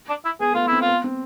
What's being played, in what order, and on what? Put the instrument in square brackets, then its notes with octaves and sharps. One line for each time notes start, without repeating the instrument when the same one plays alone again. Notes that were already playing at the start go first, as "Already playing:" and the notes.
[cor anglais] D4
E4
[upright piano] B3 [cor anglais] G#4
[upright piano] A3 B3 [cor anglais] F4
[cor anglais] E4
[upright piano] C4
[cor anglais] F4
[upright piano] B3
C4